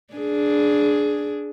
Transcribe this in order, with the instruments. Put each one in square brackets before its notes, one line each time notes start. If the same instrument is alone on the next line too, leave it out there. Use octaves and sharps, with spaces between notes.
[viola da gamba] D4 G#4